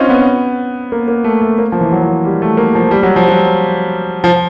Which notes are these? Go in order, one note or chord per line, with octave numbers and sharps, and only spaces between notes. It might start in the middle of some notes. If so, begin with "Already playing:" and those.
Already playing: C4 C#4 D#4 F4
B3
A#3
A#3
A3
A3
A#3
F3
E3
F#3
F3
G3
A3
A#3
F3
G3
F#3
F3
F#3
F3